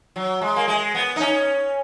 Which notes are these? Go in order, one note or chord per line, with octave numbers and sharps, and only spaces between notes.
F#3
G#3
A#3
G#3
B3
D#4
C#4